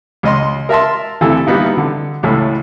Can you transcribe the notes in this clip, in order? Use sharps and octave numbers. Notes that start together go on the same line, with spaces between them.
C#2 D#5 C6
A#4 E5 A5 C6
D2 C3 E3 A4
G3 A#3 B3 D#4 E4
D3
C#2 A2 E3 A3